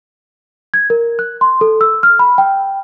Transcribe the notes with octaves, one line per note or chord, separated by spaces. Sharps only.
G#6
A#4
F#6
C6
A4
E6
F6
B5
G5